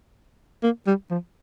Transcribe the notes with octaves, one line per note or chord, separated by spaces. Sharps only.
A#3
G3
F3